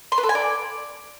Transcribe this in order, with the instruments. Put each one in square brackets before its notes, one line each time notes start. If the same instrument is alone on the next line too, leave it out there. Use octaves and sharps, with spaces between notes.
[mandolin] C6
B4
A4
G#5
D5